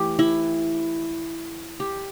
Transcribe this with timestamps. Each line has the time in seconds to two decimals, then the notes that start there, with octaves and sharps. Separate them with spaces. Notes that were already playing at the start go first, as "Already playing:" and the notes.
Already playing: E3 A3 G4
0.19 E4
1.80 G4